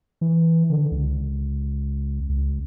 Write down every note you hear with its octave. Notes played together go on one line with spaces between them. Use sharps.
E3
D3
C#2
C#2